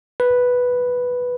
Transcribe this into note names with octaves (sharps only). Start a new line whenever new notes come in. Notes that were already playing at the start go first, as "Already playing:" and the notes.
B4